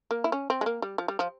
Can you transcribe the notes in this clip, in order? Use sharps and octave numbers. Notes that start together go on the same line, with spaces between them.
A#3
E4
C#4
C4
G#3
A#3
G3
F3
G3
F3